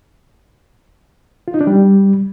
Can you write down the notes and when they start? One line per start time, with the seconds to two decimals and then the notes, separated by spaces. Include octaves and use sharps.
1.48 F4
1.54 D#4
1.61 D4
1.67 G3